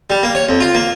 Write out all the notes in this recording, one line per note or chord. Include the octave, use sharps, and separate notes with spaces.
G3
A#3
C#5
F2
F4
A#3